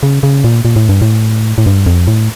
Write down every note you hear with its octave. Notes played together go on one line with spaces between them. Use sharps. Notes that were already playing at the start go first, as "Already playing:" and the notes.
C#3
C#3
A#2
A#2
A2
G2
A2
A2
G2
F2
A2